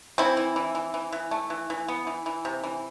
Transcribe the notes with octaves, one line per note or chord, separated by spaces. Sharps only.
E3 C4 E4
E3
E3
E3
E3
E3
A3
E3
E3
B3
E3
E3
C3
E3